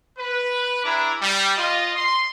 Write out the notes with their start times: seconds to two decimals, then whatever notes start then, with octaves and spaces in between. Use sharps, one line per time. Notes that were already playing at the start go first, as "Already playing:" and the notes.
0.18 B4
0.84 D4 E4 G#4 A#5 B5 D6
1.21 G3
1.57 F4 D#5
1.96 C6